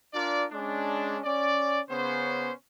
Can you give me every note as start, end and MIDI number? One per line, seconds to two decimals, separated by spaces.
0.14 0.45 62
0.14 0.45 65
0.14 0.45 70
0.14 0.45 74
0.51 1.19 56
0.51 1.19 61
0.51 1.19 62
1.25 1.81 61
1.25 1.81 74
1.90 2.51 49
1.90 2.51 59
1.90 2.51 61
1.90 2.51 72